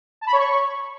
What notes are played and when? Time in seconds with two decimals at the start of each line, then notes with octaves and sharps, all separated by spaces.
0.21 A5
0.27 B5
0.33 C#5
0.38 C#6